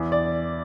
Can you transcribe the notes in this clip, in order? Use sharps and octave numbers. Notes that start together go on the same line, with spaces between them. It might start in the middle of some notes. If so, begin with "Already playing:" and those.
Already playing: E2
D5